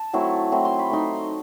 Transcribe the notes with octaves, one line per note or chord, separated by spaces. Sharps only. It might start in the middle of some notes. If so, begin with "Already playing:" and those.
Already playing: A5
F#3 A3 C4 E4
F#3 A3 C4 E4
C6
B5
A3 D#4 C6